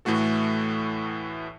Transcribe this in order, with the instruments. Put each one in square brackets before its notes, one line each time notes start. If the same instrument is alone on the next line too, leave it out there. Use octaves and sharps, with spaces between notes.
[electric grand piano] A2 E3 A3 F#4 A4